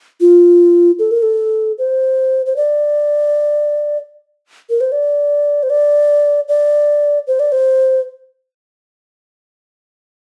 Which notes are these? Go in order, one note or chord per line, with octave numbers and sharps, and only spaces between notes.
F4
A4
A#4
A4
C5
C5
D5
A#4
C5
D5
C5
D5
D5
C5
D5
C5